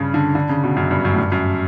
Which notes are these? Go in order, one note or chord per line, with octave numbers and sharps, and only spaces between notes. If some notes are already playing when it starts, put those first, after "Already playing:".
Already playing: G2 C#3
D3
D3
C#3
B2
F#2
G2
F#2
A2
G2
F#2